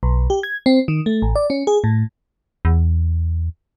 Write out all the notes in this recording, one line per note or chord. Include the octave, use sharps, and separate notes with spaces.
B1
G4
G#6
C4
D#3
A3
A1
D5
C#4
G#4
A2
E2